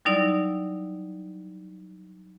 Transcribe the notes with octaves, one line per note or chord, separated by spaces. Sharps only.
F#3 G3 D#4 E4 D5